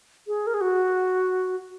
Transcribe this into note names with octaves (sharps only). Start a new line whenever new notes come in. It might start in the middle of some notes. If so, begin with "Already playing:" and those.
G#4
A#4
G#4
F#4